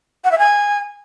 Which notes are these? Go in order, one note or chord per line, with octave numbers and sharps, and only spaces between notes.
F#5
E5
G#5